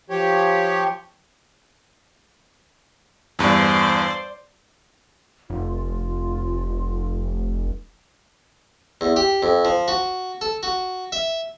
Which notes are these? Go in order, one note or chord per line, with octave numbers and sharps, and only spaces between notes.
F3 G4 C#5
E2 G2 C5 D5
F1 F4
E2
G4
F2
F3
F#4
A4
F#4
E5